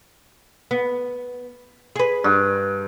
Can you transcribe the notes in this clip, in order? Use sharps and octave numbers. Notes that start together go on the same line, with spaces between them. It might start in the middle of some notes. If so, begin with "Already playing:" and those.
B3
G#4 B4
G2